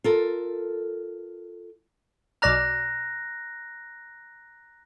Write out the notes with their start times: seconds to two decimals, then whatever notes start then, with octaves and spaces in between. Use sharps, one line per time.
0.04 F4 A4 A#4
2.42 B1 D5 A#5 F6 F#6 A#6